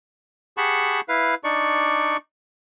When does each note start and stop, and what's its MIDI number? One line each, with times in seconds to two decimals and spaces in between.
0.57 1.01 67
0.57 1.01 68
0.57 1.01 78
0.57 1.01 81
0.57 1.01 83
0.57 1.01 85
1.09 1.35 64
1.09 1.35 71
1.09 1.35 77
1.44 2.17 62
1.44 2.17 63
1.44 2.17 74
1.44 2.17 85